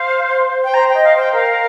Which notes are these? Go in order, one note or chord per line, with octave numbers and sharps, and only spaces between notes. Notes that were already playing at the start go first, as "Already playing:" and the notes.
Already playing: C5 F5
G5
C5 A#5
G5
D#5
F5
C5 G5
A#4 F5